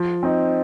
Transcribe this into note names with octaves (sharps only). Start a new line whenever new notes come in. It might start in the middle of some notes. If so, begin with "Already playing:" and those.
Already playing: F3
C4 D#4